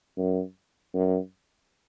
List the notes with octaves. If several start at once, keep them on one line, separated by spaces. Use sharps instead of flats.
F#2
F#2